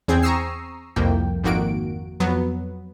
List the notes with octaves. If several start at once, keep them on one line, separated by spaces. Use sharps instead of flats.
E2 C4 G#4 G5 G#6
A#5 C#6 D#6 E6 C7
C2 F2 A#3 G5
G#1 F2 D#3 A#3 F#4 D7
F2 F#3 B3